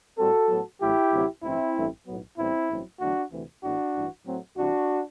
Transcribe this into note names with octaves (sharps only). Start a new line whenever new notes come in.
A2 G3 C4 F#4 A4
A2 F#3 B3
A1 A2 F#3 E4 G4
D2 C3 F#3
A1 G2 E3 C4 E4
A1 G2 E3 A3
B1 A2 F#3 B3
A1 A2 G3 B3 C4 E4
A1 G2 F#3 C4
E2 D3 F#3 A3 D4 F#4
D2 C3 E3
A1 A2 E3 B3 D4 F#4
A1 G2 E3
A2 F#3 A3 C4
C2 C3 E3 D4 F#4